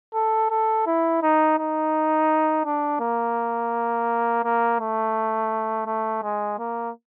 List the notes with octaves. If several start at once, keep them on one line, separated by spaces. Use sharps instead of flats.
A4
A4
E4
D#4
D#4
D4
A#3
A#3
A3
A3
G#3
A#3